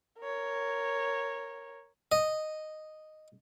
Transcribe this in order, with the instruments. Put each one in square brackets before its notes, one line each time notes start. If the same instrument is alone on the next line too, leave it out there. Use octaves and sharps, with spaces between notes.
[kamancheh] A#4 C#5
[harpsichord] D#5